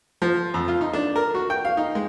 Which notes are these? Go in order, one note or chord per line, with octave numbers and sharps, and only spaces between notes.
F3
F2
F4
D#4
D4
A#4
F#4
G5
F5
D#4
G#3